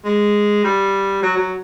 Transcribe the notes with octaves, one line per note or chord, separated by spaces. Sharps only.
G#3
G3
F#3
F#3